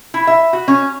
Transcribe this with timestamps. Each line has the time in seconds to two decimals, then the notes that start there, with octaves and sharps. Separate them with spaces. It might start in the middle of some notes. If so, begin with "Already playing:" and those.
0.14 E4
0.27 E5
0.53 F#4
0.68 C#4